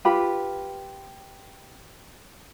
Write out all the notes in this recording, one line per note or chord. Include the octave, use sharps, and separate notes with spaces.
F4 G4 B4 B5